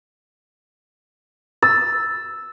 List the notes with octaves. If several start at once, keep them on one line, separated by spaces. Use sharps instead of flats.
E6 A6